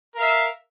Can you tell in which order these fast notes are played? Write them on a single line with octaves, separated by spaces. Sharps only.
A#4 F5 E5